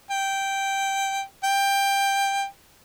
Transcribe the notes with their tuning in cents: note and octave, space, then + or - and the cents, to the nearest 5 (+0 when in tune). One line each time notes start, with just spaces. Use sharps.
G5 -5
G5 +15